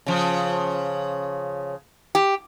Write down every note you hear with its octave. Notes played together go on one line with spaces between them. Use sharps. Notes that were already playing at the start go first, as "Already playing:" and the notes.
C#3 F3
G4